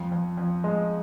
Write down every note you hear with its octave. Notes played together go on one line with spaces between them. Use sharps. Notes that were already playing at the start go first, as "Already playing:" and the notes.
Already playing: F2
F2
F2
G#3